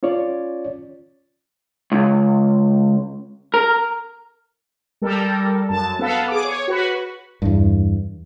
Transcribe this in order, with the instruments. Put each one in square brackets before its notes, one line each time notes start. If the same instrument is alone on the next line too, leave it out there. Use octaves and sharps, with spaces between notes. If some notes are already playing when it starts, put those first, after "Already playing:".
[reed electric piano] C#4 F4 C#5 D5
[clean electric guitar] C#2
A#4
[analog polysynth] G3 A4 A#4
F#2 A5
B3 A4 F5
G#4 D6
C#5
F#4 B4
[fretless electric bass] E2 G2